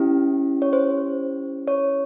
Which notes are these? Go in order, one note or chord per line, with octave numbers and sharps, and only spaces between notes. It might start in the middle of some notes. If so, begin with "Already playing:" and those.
Already playing: C#4 E4 G4
C#5
C5
C#5